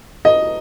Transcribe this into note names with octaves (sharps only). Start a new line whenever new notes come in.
D#5